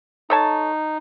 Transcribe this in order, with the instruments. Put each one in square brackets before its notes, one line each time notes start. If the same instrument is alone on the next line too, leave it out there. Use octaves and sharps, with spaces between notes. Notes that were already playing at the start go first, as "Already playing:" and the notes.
[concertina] D#4 [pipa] A4 C#5 A5